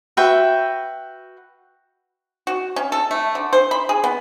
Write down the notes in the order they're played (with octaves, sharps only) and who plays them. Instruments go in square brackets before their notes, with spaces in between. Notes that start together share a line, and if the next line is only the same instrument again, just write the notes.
[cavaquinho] F#4 B4 E5 G5
[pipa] F#4
C#4
A4
A3
D3
C5
B5
G#4
B3